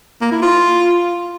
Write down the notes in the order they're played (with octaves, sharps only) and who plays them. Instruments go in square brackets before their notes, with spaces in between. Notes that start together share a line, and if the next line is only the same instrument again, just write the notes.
[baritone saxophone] A#3
E4
F4